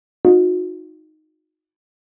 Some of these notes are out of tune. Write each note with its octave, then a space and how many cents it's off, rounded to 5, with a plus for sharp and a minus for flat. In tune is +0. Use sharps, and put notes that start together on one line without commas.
D#4 +0 F#4 -40